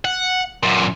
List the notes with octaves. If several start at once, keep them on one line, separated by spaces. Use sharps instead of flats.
F#5
F#2 A#2